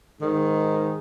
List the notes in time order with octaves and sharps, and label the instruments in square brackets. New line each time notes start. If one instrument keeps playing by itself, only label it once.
[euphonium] G#2 [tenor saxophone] D#3